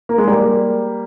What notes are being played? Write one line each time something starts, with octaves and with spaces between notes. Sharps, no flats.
A#3
G#3
G3 A#3